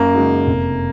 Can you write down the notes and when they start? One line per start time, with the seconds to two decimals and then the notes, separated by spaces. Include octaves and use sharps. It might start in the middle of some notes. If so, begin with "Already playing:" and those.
Already playing: F#2 A#3
0.14 C#3 G#3 D#4 F#4
0.47 F1